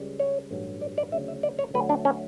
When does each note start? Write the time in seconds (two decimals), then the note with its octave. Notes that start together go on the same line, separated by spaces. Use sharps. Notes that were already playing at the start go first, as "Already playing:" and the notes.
Already playing: C#2 C#3 G3
0.20 C#5
0.51 A1 G2 F#3
0.81 D5
0.98 D5
1.12 D2 C#3 F#3 E5
1.28 E5
1.43 D5
1.59 C#5
1.74 D2 D3 F#3 A3 B4
1.89 D4
2.05 C#4